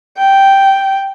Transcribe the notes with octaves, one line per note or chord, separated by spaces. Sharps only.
G5